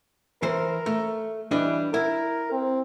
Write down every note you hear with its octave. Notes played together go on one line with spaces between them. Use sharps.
E3 A#4 C5
A3
E3 G3 D4 D#5
E4 A#4
C4